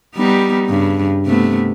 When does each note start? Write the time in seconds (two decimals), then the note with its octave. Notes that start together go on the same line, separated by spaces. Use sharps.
0.15 G3 B3 D#4
0.67 G2 C#3
1.25 C3 A3 B3